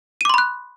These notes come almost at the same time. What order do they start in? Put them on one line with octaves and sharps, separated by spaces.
D#7 D6 C6 B5 F#6